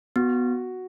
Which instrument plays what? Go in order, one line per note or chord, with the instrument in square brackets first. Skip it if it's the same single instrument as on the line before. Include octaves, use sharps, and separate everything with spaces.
[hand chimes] B3 [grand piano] F#4